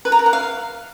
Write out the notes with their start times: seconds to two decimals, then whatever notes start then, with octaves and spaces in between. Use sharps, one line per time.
0.05 B4
0.12 A#5
0.19 A#4
0.26 F#5
0.33 F5